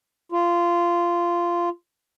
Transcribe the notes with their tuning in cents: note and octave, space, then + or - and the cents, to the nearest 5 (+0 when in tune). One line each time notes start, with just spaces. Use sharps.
F4 -15